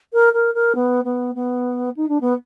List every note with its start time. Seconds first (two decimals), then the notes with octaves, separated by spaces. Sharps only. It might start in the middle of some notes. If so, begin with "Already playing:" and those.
0.13 A#4
0.33 A#4
0.54 A#4
0.75 B3
1.04 B3
1.35 B3
1.96 D#4
2.08 D4
2.20 B3